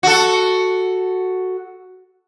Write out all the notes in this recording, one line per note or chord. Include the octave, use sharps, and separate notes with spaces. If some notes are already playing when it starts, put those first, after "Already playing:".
F#4 A4